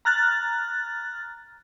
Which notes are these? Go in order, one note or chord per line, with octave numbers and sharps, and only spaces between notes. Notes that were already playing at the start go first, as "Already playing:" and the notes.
A#5 F6 F#6 A6